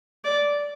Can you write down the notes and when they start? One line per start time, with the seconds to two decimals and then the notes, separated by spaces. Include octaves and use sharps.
0.24 D5